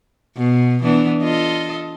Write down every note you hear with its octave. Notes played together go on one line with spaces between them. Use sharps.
B2
E3 B3 D4
F4 A4 D#5